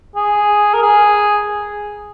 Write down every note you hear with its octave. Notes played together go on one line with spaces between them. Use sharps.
G#4
A#4
G#4